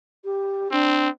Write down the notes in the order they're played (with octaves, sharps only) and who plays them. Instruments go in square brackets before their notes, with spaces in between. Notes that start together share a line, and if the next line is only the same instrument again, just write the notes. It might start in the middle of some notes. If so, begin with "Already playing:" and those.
[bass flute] G4
[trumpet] C4 [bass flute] D4